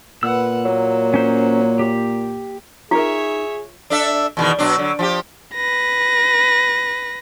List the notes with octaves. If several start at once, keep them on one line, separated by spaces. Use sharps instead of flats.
A#2 B4 F#5 E6
F#3 A#3
C#4 C5
G4
D#4 F4 G#4 A#4 C#5 E5
D4 A4 E5
E2 B2 D#3
B2 F#3 D4
D3 F#3
F3 F4 G4
B4 A#6